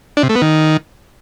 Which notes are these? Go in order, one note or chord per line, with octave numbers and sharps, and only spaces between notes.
D4
C3
A3
B3
D#3